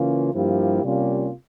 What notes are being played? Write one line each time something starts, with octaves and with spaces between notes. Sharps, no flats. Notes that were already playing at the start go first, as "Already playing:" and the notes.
Already playing: C#3 E3 A#3 C#4 F4
G2 F3 A#3 E4 G4
C3 G3 A#3 C#4 F4